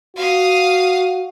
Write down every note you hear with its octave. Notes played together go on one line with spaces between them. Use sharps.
F#4 F5 D#6